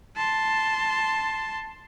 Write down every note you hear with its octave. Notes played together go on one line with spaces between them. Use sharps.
A5 C6